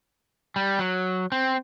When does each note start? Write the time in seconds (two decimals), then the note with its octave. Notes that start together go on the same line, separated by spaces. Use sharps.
0.56 G3
0.79 F#3
1.32 C4